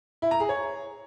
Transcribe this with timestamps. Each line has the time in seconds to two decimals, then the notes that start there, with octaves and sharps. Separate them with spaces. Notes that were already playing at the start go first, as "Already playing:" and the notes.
0.22 E4
0.31 A#5
0.40 G#4
0.49 C#5